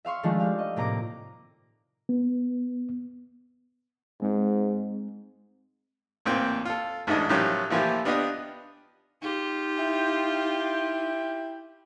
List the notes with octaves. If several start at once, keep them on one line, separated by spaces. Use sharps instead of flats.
E5 F5 C6 C#6
D#3 F3 G#3 A3 D4
G4 F5
D#5
A2 C3 A#3 A#5 D6 D7
B3
G#2 G#3 C4
A1 A#2 C4 G5
F4 A4
A1 G#2 D4 E4 A4 D#5
A2 D#3 F3 F#3 C#4 G4
A#2 E3 F3 A3 F4 G4
B3 D4 F4 G4 D#5
D#4 F4 G4
E4 G5